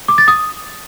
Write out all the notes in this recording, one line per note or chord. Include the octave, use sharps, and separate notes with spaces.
D6
A6
D#6